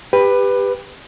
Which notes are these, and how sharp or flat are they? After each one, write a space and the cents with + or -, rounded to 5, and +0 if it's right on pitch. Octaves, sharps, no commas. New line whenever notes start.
G4 +20 B4 +5